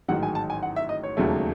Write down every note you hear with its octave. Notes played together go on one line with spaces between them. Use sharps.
A1 G#2 D#3 F#3 F#5
G#5
A5
G#5
F#5
E5
D#5
C#5
E1 D#2 C#3 F#3 A3